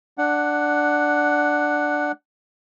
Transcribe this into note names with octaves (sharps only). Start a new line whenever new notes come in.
D4 F#5